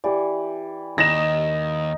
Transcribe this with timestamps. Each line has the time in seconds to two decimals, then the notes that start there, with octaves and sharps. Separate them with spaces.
0.04 E3 G4 D5
0.98 D#2 D#4 A#6 E7